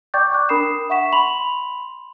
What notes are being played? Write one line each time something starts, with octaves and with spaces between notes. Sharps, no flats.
D5 G5 C#6 D6 G6 A6
G5 D6 F#6
D4 A#4 B5 D#6 C7 E7
E5 F#5 C#6 B6 E7
B5 C6 F7 F#7